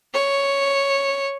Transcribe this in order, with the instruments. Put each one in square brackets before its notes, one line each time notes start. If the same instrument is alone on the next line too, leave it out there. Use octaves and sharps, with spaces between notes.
[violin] C#5